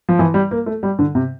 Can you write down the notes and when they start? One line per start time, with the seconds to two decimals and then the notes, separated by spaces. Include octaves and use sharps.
0.09 F3
0.19 E3
0.34 G3
0.51 A#3
0.66 A3
0.83 G3
0.99 D3
1.15 C3